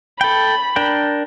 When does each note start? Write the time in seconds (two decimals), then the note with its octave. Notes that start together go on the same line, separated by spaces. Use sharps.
0.21 A4 G5 B5
0.76 D4 A#4 G5